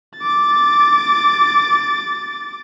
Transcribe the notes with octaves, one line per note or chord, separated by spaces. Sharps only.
D6 A6